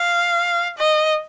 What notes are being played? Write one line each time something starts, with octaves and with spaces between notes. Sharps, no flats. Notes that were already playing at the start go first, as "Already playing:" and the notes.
Already playing: F5
D#5